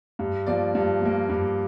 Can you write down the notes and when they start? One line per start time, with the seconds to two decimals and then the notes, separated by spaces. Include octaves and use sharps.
0.19 G2
0.46 F3 A#3 D5
0.75 G2
1.02 F3 A#3
1.29 G2